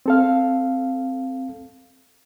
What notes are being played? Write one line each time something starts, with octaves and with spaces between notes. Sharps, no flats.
C4 A4 F5